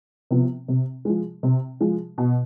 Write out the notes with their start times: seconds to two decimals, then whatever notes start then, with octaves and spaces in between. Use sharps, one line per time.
0.31 C3 F3 B3
0.68 C3
1.05 F3 G#3
1.43 C3
1.81 F3 G#3
2.18 B2